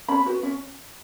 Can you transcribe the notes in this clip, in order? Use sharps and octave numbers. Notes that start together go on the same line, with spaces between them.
C#4 B5
F#4 B4
C#4